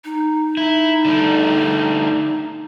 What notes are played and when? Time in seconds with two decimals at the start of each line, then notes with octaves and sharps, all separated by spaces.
0.04 D#4
0.57 E4
1.05 D3 G3 A3